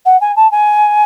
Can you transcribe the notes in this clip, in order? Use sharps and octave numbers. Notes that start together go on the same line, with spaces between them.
F#5
G#5
A5
G#5